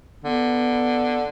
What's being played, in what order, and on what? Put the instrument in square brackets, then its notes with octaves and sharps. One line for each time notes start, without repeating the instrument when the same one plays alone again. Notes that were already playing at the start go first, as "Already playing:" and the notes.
[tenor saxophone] D3 [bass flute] B3